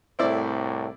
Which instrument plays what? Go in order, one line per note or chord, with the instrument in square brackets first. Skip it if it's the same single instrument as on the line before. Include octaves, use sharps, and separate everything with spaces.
[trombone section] C2 A2 [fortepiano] C4 E4 D5